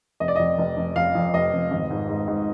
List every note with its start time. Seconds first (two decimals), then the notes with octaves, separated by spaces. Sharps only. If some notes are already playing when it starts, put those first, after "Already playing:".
0.20 F1 D#5
0.28 D5
0.36 F2 D#5
0.58 F1
0.77 F1
0.96 F2 F5
1.15 F2
1.33 F1 D#5
1.53 F1
1.71 G#1
1.90 G#2
2.09 G#2
2.28 G#2